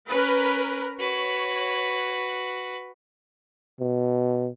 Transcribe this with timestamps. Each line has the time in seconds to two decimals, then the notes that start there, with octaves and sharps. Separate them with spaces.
0.10 C#4 A#4 B4
1.00 F#4 B4 C#5
3.80 B2